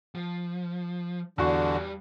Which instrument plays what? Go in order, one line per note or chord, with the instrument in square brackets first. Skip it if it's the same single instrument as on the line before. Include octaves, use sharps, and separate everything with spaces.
[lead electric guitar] F3
[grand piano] E2 F#4 C#6 [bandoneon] D3 [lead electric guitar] G3 F5